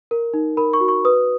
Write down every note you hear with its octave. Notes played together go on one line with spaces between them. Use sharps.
A#4
D#4
A#4 B5
C#6
F#4
C#6
B4 D#6